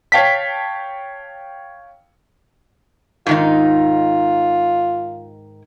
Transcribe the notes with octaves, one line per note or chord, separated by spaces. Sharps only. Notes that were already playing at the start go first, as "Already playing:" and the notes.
C#5 F5 G5 A5 B6
G#2 D#3 D#4 F4